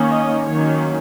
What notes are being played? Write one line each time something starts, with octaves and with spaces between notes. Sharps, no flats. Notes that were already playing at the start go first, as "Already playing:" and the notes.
Already playing: D#3 A#3 C#4
D#5
D#3 F#3 A#3 C#4 C#5